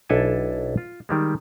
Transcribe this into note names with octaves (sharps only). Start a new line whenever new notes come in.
B1 D4 E4 A4 G#5 A5
F4
D#3 G3 G#3